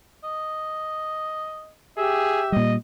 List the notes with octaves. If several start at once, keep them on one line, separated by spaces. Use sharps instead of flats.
D#5
G4 G#4 E5
A#2 G3 D#5